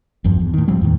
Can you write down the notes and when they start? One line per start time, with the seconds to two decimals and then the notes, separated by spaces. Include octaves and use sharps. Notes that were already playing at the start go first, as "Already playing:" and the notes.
0.24 G1 E2 G2 F3
0.40 E2
0.54 A2 D#3
0.68 D1 F3 G3 C4
0.82 E2 A2 D#3